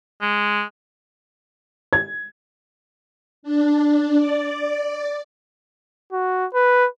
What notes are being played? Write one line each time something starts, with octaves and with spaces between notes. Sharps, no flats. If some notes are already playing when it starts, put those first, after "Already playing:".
G#3
G#6
D4
D5
F#4
B4